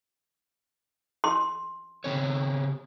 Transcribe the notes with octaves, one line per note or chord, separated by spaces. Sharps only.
C6
C#3 C4 C#5